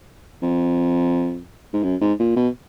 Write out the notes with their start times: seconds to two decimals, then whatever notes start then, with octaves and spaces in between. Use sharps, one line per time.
0.42 F2
1.73 G#2
1.83 F#2
2.01 G#2
2.19 A#2
2.36 B2